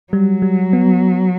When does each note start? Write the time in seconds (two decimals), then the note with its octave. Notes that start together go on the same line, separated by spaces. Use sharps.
0.13 F#3 G3
0.42 G3
0.73 B3